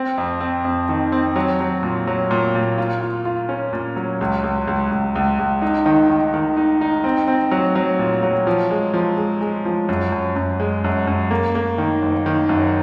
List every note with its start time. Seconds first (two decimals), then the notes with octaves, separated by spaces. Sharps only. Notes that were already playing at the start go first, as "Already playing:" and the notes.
Already playing: C4
0.18 F2
0.41 C4
0.64 F2
0.89 D#3
1.12 C4
1.36 F#3
1.60 F#3
1.83 A#2
2.07 F#3
2.31 A#2
2.55 A#2
2.78 F4
3.02 F4
3.25 F4
3.49 C#4
3.73 A#2
3.96 F#3
4.21 C#2
4.44 C#2
4.67 C#2
4.91 C#2
5.15 C#2
5.39 C#2
5.62 D#4
5.86 D#3
6.09 D#3
6.34 D#3
6.57 D#4
6.81 D#4
7.04 C4
7.28 C4
7.51 F#3
7.75 F#3
7.99 A#2
8.23 F#3
8.47 F3
8.71 G#3
8.94 F3
9.17 G#3
9.41 G#3
9.65 F3
9.89 F#2
10.12 F#2
10.36 F#2
10.60 G#3
10.84 F#2
11.07 F#2
11.31 A#3
11.55 A#3
11.78 D#3
12.02 F#1
12.26 D#3
12.49 F#2